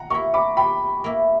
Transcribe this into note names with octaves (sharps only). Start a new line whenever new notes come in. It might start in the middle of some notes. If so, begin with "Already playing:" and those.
Already playing: G3 F#5 A#5
A#3 E4 A#5 C#6
B5 D6
G3 G5 B5
A#3 E4